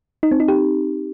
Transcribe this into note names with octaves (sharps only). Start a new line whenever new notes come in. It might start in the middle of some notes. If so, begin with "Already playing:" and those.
D#4
C4
D#4
G4